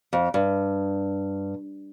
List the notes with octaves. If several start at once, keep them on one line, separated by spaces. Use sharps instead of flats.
F2
G2